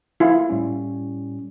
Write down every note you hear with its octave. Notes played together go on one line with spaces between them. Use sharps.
E4 F4
A2 G3 C#4